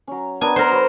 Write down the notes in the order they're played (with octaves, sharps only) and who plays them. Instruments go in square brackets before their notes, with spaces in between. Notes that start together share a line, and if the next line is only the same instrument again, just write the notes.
[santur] F#3 C#4
[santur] B3 D4 A#4 [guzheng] G#5
[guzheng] A#4 C5 [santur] F#5 A#5
[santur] F#3 B4 A#5